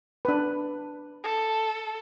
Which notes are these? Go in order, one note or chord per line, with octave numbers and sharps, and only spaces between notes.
D4 B4
A4